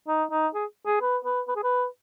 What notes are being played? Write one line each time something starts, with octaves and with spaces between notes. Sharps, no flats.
D#4
D#4
G#4
G#4
B4
B4
B4
G#4
B4